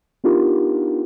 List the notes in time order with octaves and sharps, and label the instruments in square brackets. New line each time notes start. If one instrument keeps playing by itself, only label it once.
[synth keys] B3 D4 D#4 F4 G4 A#4